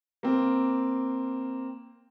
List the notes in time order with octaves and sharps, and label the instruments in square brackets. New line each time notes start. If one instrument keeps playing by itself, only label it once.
[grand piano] A#3 C4